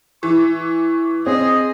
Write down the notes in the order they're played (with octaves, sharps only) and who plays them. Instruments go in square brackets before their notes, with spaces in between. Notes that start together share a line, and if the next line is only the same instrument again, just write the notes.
[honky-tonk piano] E3 [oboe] C#6
[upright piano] C4 [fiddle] G#4 [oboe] D#5